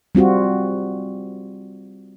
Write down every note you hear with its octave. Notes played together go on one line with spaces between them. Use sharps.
G3 C4 F4 F#4